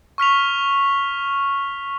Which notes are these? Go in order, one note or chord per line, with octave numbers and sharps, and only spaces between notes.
C#6 F6 B6 F7